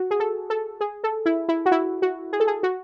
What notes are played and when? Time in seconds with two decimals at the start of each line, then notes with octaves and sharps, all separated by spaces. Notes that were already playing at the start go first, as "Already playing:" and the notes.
Already playing: F#4
0.11 G#4
0.20 A4
0.50 A4
0.81 G#4
1.04 A4
1.26 E4
1.49 E4
1.66 F#4
1.72 E4
2.02 F#4
2.33 G#4
2.40 A4
2.47 G#4
2.63 F#4